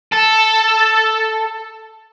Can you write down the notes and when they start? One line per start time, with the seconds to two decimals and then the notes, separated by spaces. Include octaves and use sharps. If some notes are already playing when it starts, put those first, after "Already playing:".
0.13 A4